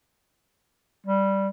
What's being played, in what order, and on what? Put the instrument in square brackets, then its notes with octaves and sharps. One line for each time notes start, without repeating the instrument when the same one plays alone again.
[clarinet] G3